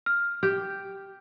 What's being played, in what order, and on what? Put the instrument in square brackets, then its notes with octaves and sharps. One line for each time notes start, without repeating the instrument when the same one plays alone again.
[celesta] F6
[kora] G4